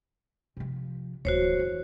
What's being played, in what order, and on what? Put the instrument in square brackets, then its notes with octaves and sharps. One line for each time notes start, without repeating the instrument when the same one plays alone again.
[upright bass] C3 F3
[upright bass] D1 E3 [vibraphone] F#4 C5 C#5
[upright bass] E2